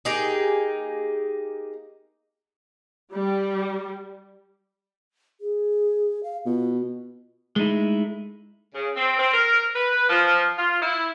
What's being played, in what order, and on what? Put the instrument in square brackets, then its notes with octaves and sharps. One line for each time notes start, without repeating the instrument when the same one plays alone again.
[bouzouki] A#3 D#4 G4 G#4
[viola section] G3
[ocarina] G#4
F5
[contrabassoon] B2 [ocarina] F4
[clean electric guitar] G#3 A3 D#4 E4
[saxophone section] C#3
C4
C4
A#4
B4
F3
F4
E4